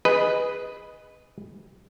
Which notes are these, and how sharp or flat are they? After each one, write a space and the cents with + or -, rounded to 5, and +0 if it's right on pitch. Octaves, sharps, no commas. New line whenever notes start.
G#4 -10 B4 +0 D#5 +0